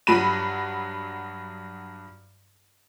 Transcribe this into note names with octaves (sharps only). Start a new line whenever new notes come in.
G2 F#3 B5 D#7